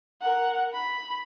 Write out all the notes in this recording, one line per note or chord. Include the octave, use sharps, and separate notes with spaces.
A#4 F#5
B5